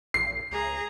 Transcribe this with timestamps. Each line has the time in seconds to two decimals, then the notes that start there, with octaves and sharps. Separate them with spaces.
0.14 A#1 C7
0.52 C#2 G#4 A#5